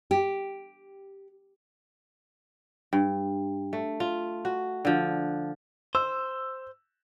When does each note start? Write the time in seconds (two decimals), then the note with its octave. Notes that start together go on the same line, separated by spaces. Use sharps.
0.11 G4
2.93 G2
3.73 A3
4.00 F4
4.45 F#4
4.85 D3 F3
5.95 C5 E6